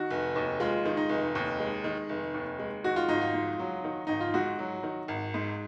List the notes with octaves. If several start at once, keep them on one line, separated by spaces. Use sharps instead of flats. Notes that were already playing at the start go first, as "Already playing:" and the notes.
Already playing: D#3 F#4
F1
D#2
G#3 F4
D#3
D#4
F1
D#2
G#3
D#3
F1
D#2
G#3
D#3 F#4
F4
G#1 D#4
F4
G#2
F#3
D#3
G#1 D#4
F4
G#2 F#4
F#3
D#3
G#1
G#2